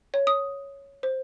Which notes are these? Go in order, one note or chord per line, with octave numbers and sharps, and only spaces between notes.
C#5
D#6
C5